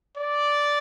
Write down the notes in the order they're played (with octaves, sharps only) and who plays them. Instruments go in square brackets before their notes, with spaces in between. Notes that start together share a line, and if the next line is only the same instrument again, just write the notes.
[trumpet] D5